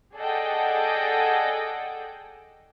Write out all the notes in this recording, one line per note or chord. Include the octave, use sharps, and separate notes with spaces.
G#4 A4 D5 D#5 F#5 G5